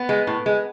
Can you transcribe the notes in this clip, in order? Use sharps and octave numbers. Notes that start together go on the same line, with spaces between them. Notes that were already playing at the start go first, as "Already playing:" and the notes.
Already playing: B3
G#3
A2
G#3